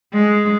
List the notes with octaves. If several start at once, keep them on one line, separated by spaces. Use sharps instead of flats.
G#3